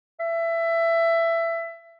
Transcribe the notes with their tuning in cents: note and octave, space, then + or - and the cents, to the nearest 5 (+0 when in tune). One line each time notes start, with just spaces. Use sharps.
E5 +20